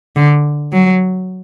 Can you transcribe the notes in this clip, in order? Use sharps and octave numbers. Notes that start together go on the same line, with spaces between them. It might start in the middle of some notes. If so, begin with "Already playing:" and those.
D3
F#3